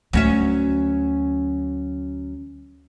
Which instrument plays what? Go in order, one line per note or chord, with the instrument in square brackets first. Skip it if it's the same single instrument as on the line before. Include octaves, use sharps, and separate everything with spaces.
[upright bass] D2 [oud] F#3 C#4 E5